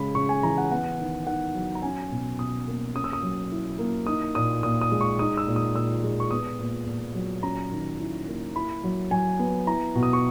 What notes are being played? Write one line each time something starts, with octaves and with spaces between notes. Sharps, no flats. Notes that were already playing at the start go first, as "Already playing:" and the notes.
Already playing: C#3 G#3 B5
C#3 C#6
G#5
E3 A#5
F#5
B3 F#5
D#3
D#3 F#5
F#3
A#5
C#4 G#5
B2
B2 D#6
A#3
C#4 D#6
E6
D#6
F#3
E4
A#3
D#4 D#6
A#2 D#6
A#2 D#6
D#6
G#3
C#6
D#4 D#6
E6
A#2
D#6
A#2 E6
G#3
C#6
B3 D#6
A#2
A#2
F#3
C#4 A#5
D#3
E4
A#3
E4 B5
F#3
F#3 G#5
B3
E4 A#5
B2
D#6
C#6